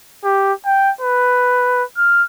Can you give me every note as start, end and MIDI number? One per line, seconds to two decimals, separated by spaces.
0.24 0.53 67
0.66 0.91 79
1.01 1.84 71
1.98 2.24 89